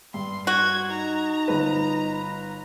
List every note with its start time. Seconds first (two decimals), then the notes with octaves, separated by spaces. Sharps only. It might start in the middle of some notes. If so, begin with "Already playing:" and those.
0.14 G2 C6
0.47 F#4 G#6
0.90 D#4 A#5
1.48 G1 B4